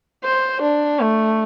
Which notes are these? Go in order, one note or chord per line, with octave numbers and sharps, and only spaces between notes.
C5
D4
A3